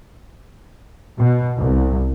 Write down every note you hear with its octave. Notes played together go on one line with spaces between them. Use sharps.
B2
C2